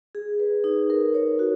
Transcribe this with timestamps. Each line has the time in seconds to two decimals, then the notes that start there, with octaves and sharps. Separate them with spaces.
0.15 G#4
0.40 B4
0.64 D#4
0.90 A#4
1.14 C#5
1.39 F#4